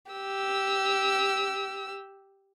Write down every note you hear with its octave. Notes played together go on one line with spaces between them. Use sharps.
G4 E6